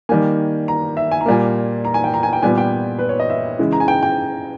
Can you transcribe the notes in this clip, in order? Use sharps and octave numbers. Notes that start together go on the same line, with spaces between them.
D#3 G3 A#3 G#5
A#5
E5
G#5
A#5
A#2 G3 A#3 G#5
A#5
G#5
G5
A#5
G#5
G5
A#2 G3 B3 G#5
G5
B4
C#5
D#5
E5
C#3 E3 G#3
A#5
G#5
G5
G5